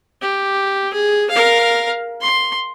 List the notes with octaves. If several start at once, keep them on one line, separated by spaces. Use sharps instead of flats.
G4
G#4
A#4 F5
C6